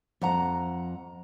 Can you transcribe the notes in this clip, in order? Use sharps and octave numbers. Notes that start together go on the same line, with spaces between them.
F2 F#5 A#5